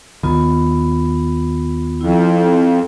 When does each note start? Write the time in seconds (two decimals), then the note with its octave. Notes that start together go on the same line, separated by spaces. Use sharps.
0.23 D#2 D#3 B3 F4
2.01 F2 E4